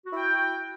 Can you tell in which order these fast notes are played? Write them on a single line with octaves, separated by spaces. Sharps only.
F#4 E4 G5